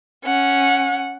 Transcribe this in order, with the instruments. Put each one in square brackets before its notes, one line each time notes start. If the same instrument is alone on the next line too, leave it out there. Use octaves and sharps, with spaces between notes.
[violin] C#4 F#5